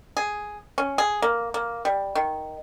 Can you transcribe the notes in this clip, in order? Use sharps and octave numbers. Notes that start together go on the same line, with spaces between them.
G#4
C#4
G#4
A#3
A#3
G3
D#3